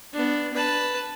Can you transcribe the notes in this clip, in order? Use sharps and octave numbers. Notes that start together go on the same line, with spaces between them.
B3 D4
B4 A5